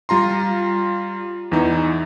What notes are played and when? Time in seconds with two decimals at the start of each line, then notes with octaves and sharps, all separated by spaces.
0.09 G3 F4 A#5 C6
1.52 E2 E3 D#4 E4